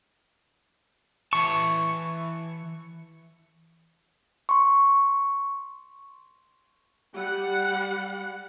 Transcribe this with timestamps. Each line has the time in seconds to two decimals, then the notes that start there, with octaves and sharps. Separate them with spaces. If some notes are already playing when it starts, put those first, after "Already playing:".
1.33 E3 A5 C#6
4.49 C6 C#6
7.15 G3 F#5